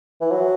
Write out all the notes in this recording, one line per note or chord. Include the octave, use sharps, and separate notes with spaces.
E3
F#3